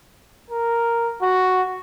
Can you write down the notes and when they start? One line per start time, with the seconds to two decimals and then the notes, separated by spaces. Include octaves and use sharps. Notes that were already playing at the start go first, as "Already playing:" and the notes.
0.50 A#4
1.22 F#4